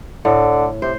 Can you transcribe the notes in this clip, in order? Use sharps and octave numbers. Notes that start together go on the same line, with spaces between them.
A2 D3
C3 C5